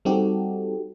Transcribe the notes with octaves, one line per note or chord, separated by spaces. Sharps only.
G3 C4 D#4 F#4 G4 A4